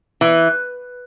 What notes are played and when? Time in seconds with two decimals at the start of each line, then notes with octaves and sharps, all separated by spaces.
0.21 E3